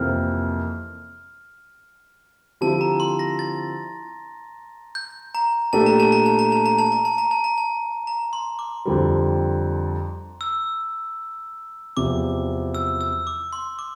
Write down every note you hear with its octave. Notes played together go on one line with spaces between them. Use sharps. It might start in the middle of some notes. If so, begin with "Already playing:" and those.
Already playing: F2 C3 E3 A#3 F6
D3 F3 C4 E4 G4 A5
A#5
C6
A#6
A6
G6
A#5
A#2 A3 D4 G4 A5
A#5
A5
A#5
A5
A#5
A5
A#5
A5
A#5
A5
A#5
A5
A#5
A5
A#5
C6
D6
F2 D3 G3
E6
E2 C3 F3 D6
E6
E6
D6
C6
D6